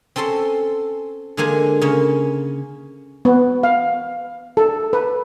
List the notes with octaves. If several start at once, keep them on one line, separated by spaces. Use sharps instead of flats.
C4 C#4 A4 A5 C6
D3 G#3 A#3 C5 G#5
C#3 A#3 C#4
B3
F5
A4
B4